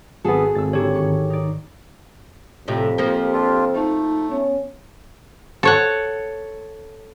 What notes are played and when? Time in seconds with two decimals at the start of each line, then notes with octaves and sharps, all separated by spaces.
0.24 G#1 B3 F#4 G#4 A4
0.55 G#1 E6 A6
0.73 D3 D#3 G4 C#5
0.94 G#2 C#6
1.30 D#4 D5
2.68 F2 A2 C3 G4
2.98 F3 A#3
3.33 C4 D4 F4
3.74 A3 D#4
4.31 B3 C#4
5.63 A4 C#5 F#5